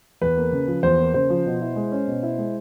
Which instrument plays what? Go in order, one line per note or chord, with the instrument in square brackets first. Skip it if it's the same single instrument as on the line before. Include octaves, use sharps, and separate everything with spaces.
[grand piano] E2 [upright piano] B4
[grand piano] A#3
C#3
F3
[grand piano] E2 [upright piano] C5
[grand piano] A#3
[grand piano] C#3 [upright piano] C5
[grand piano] F3
B2
E4
G#3
C#4
B2
E4
G#3